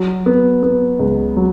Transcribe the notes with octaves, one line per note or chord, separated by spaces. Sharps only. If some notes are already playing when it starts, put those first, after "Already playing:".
Already playing: F#3
B3
B3
C#2
F#3